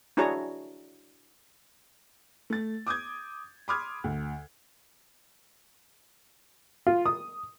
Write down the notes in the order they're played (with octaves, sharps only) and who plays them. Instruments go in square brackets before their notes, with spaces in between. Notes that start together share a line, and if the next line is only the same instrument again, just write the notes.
[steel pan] D4 E4 F#4 G#4 C#5 A#5
[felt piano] A3 A6
D6 D#6 G6 G#6
B5 C6 D6 D#6 F6 G#6
D2
[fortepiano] F4
D#6